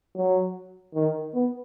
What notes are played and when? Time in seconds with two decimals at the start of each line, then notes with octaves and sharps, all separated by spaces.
0.16 F#3
0.94 D#3
1.34 B3